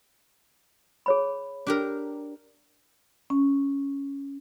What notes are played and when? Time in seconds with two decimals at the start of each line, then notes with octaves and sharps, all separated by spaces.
1.06 G#4 C#5 B5
1.67 D4 G4 A#4
3.30 C#4